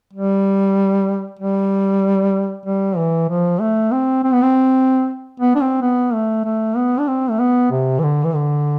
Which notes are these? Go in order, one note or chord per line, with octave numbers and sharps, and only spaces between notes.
G3
G3
G3
E3
F3
A3
C4
C4
B3
C4
B3
D4
C4
B3
A3
A3
B3
D4
C4
A3
B3
C3
E3
D3
E3
D3